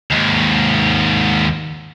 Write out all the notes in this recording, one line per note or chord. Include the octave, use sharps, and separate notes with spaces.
D#2 G#2